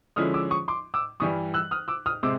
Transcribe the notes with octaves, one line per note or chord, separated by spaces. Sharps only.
D3 F3 G#3 C#4 E4 D#6 F6
D6 E6
C#6 D#6
C6 D6
D6 E6
G2 E3 G3 C#6 D#6
E6 F#6
D#6 F6
D6 E6
D#6 F6
C3 G#3 C4 D6 E6